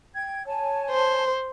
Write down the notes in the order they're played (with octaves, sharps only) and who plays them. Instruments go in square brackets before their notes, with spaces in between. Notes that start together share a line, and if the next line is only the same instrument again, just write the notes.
[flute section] G5 G#6
C#5 G#5 A5
[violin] C5